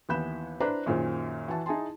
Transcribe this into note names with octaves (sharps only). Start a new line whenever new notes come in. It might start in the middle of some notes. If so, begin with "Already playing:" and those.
D#2 E3 B3 B5 G6 E7
D4 E4 B4 C5 A#5
F#2 A#2 D#3 F4 G#4 C5
E3 F#4 A5
D#4 E4 G#4 G#5 A5 C6